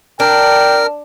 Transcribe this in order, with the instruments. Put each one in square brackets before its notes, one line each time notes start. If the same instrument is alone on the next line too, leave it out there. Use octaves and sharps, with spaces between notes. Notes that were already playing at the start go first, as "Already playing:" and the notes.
[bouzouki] D4 [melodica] A#4 [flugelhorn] G5